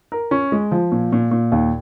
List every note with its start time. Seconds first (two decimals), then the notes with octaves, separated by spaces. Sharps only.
0.12 A#4
0.31 C#4
0.52 G#3
0.71 F3
0.92 A#2
1.13 A#2
1.31 A#2
1.52 D#2